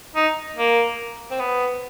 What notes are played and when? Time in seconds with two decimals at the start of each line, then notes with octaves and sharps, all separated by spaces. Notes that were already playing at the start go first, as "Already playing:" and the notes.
0.15 D#4
0.56 A#3
1.30 C4
1.40 B3